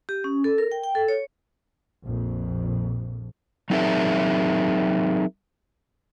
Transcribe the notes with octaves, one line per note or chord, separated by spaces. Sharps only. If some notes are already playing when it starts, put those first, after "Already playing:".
G4
C#4
A4
A#4
G5
G5
A4
C#5
A#1 F2
F#3 C4 D#4 G#4 A#4 E5